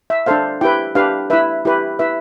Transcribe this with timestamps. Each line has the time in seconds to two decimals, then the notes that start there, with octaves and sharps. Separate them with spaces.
0.10 E5
0.26 D4 A4 C5 F5
0.61 E4 G4 B4 G5
0.95 D4 G4 B4 F5
1.30 E4 B4 E5
1.65 E4 G4 B4
1.99 E4 B4 E5